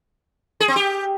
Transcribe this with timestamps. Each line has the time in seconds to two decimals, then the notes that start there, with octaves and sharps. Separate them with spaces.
0.60 G#4
0.68 C4
0.76 G4